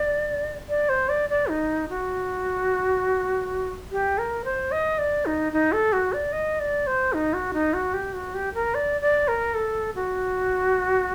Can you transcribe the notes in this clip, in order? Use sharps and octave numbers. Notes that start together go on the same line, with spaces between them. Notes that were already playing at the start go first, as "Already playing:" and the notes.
Already playing: D5
D5
C5
D5
D5
D#4
F#4
G4
A#4
C5
D#5
D5
D#4
D#4
A4
F#4
D5
D#5
D5
C5
D#4
F#4
D#4
F#4
G4
F#4
G4
A#4
D5
D5
A#4
A4
F#4